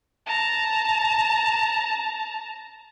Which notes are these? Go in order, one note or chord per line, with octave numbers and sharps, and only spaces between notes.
A5 A#5